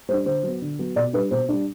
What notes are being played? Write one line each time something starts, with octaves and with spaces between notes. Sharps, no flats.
G3 D4 C5
D3 C5
F#3 B3
D3
F#3 B3
B2 D5
G3 D4 B4
B2 C5
G3 D4